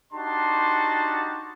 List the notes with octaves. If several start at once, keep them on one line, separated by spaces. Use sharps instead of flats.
D4 D#4 F#4 G4 A5 C6